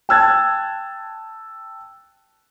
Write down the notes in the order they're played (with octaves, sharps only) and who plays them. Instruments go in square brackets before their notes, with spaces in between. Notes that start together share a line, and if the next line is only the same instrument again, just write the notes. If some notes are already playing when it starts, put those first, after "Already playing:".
[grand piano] G5 A5 E6 F#6 G#6 A6